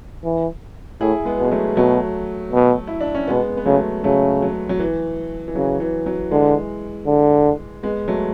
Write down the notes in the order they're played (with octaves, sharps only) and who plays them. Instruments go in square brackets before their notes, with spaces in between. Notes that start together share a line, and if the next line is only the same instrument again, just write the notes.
[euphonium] E3
[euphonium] A2 [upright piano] E4 G#4
[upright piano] G#3 B3
[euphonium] B2
[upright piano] G#3
F#3 A3
[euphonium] B2 [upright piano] F#3 A3
[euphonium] B2
[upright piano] E4
D4
C#4
[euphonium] B2 [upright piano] G#3 B3
[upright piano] B3
[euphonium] C#3 [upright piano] F#3 A3
[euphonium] C#3 [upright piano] F#3 A3
[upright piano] F#3
F#3
E3
E3
[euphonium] C#3 [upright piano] F#3
[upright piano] E3
F#3
[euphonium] D3 [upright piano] E3 G#3
[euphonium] D3
[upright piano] G#3 B3
F#3 A3